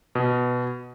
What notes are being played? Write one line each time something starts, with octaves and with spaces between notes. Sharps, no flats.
B2